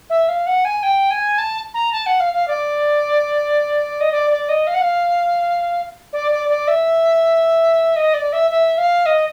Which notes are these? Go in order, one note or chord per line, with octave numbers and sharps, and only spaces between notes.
E5
F5
F#5
G#5
G5
G#5
A5
A#5
A5
F#5
F5
F5
D5
D#5
D5
D5
D#5
F5
F#5
F5
D5
D5
D5
E5
D#5
D5
E5
E5
F5
D#5